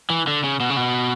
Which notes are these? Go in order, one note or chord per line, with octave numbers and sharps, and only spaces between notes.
E3
D3
C#3
B2
C#3
B2